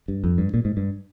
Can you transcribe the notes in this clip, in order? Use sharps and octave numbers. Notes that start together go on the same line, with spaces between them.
G2
F2
G2
A#2
G#2
G2